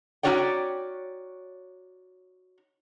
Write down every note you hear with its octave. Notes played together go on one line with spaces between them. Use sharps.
C#4 D#4 F#4 C#5 D5 G5